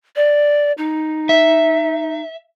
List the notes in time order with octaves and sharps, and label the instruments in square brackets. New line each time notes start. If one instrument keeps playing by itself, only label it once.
[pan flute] D5
D#4
[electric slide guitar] E5